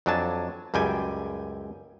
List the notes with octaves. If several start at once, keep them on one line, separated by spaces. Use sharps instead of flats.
F2 F#3 D4 G#5 A5
C#2 F#2 G3 G5 G#5